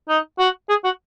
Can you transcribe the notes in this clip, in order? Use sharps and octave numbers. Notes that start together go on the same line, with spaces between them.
D#4
F#4
G#4
F#4